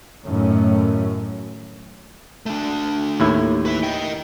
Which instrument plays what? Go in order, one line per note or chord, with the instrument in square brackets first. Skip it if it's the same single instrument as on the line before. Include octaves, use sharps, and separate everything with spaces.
[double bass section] F#2 A2 D#3 F#3 A3 C#4
[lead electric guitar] A3 D4
[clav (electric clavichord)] D#2 A2 E4
[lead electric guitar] B4 E5
D#5 G5